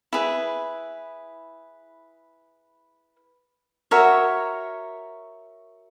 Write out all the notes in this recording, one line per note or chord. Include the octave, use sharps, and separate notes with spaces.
E4 G#4 B4
F#4 A#4 C#5 E5